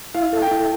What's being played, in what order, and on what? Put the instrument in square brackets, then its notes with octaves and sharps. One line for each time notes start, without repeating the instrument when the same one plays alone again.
[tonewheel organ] E4 [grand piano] F5
[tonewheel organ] A4
[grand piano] G5
[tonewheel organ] E4